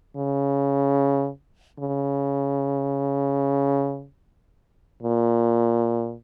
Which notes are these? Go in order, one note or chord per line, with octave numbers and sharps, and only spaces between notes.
C#3
C#3
A#2